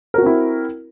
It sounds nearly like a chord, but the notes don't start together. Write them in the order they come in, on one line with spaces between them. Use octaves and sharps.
A#4 F#4 C4 E4